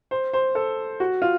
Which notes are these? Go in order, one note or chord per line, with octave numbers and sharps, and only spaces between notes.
C5
C5
A4
F#4
F4